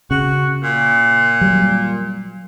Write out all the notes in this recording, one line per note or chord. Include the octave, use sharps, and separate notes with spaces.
C#3 F#4
A#2
F#3 G3